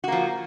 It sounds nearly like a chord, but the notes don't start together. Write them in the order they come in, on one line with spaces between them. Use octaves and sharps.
F#4 A#3 F3